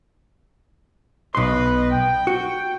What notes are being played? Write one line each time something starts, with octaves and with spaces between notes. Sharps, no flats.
B1 B4 D#5 C6
G5
F#4